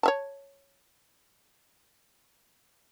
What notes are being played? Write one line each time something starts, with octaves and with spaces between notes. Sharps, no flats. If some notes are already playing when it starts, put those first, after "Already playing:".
C#5 E5 A5